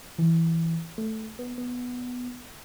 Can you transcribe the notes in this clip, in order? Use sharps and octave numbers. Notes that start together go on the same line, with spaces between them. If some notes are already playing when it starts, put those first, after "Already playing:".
E3
A3
B3
B3